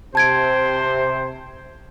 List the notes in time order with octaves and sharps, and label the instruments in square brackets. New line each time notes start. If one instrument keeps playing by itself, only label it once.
[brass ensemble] C3 [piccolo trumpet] C5 [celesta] A5 G#6 D7